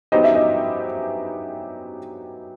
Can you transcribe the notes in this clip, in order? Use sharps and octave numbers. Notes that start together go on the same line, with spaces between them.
F#3 B3 D#4 G4 C5 D#5
E5
D#5